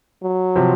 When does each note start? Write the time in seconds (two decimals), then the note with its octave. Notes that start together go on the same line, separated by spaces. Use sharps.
0.23 F#3
0.56 C3 F3